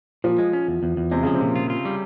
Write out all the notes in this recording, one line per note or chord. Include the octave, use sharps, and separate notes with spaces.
A#2 F3
G#3
C#4
E2
E2
E2
C3 G#3
C#3 F3
C3
A#2
F4
F4
G3